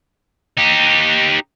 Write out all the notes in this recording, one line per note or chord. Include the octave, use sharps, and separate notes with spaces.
D#4 G4